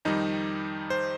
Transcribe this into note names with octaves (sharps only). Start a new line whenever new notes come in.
F2 D#3 G3 D#4
C5